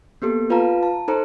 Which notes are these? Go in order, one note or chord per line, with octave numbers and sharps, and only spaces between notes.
A#3 B3 G4 A4
F4 B4 F5 A5 A#5
A5
D#4 A4 C5 A#5 C#7